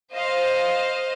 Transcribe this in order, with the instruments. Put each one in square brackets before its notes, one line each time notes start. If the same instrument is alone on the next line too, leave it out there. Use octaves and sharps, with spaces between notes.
[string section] C5 D#5 F5